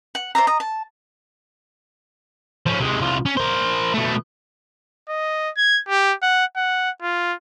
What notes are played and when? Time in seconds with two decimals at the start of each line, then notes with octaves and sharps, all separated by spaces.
0.15 F#5
0.35 C5 D5 E5 A#5
0.47 D#5 A#5
0.60 A5
2.66 F3 C#4
2.80 C3 G#3
3.00 C2 F4
3.26 C#4
3.37 A#4 C5
3.94 B2 A3
5.09 D#5
5.57 G#6
5.88 G4
6.22 F#5
6.56 F#5
7.02 F4